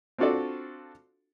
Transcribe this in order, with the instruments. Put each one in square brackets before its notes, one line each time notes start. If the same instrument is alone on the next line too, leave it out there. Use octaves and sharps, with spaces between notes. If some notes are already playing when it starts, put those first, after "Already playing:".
[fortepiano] C4 D4 F4 F#4 A4 D5